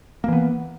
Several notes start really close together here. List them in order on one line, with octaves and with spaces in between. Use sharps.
A#3 E3 B3